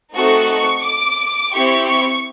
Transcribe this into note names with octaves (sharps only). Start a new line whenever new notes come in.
A3 C4 D#4 F#4 A4 C#6
C#6
D6
C4 E4 G4 C#6
C#6